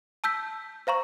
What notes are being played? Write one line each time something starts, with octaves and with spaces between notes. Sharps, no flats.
A5 E6 G6 B6
C5 F5 A#5 C#6